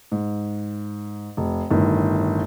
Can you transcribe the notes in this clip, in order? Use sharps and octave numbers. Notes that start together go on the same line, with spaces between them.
G#2
F1
G1 A2 D#3